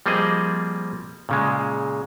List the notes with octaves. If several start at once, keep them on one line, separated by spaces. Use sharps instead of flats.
F3 G3 A#3 C4 G#4 D#5
A#2 C#3 G#3